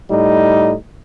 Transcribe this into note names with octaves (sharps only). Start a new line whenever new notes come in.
A2 G3 D#4